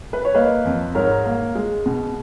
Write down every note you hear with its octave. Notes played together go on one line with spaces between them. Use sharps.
B4
C#5
A#3 B4 D#5
F2
G#2 A#4 C#5
A#3
G#3
B2